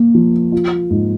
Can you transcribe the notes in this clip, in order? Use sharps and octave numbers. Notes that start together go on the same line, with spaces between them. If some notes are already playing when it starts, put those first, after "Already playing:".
Already playing: A#2 A#3
F3
F4
G#2